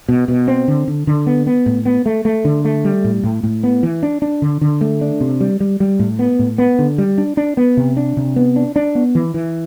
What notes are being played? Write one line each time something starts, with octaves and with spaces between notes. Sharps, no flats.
B2
B2
C4
D3
D3
D3
B3
B3
A2
B3
A3
A3
D3
A3
G3
A2
A2
A2
B3
E3
D4
D4
D3
D3
A3
D4
C3
G3
G3
G3
A2
B3
A2
B3
D3
G3
D4
D4
B3
C3
D4
C3
B3
D4
D4
B3
E3
E3